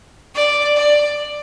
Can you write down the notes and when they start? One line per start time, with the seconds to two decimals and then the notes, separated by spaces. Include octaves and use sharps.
0.34 D5
0.76 D5